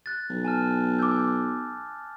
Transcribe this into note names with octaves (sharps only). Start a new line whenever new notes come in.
F#6 A6
B1
G#5 A5 F6
D6 E6 G6